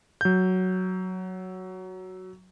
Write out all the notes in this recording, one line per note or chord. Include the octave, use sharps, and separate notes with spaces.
F#3 G6